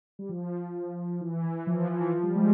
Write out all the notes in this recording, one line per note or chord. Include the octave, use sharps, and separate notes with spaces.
G3
F3
E3
E3
F3
E3
F3
E3
F3
G3
G#3